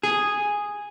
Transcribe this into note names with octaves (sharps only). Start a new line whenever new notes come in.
G#4